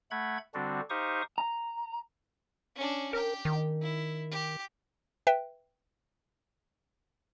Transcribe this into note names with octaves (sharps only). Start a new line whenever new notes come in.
A3 F#5 B5 G#6
D3 G3 C4 D4 F#4
D#4 G4 C5 F5 C#6 D#6
A#5
C#4 D4
G4 A#4 G5
D#3
E4
G4
B4 E5 G5